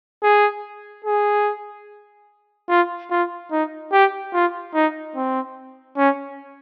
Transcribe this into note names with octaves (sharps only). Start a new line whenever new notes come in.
G#4
G#4
F4
F4
D#4
G4
F4
D#4
C4
C#4